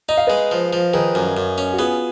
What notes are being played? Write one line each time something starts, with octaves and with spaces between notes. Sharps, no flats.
D#4 D#5
F5
G#3 B4 D#5
F3
F3
D#3 G#4 B4
F#2
F#2
C#4
F#4
B3 F4 G#4